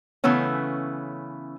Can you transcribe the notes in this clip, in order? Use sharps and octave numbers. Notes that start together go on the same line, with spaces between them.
C#3 E3 A3 B3 C#4